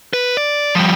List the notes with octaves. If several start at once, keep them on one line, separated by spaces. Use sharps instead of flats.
B4
D5
F3 G3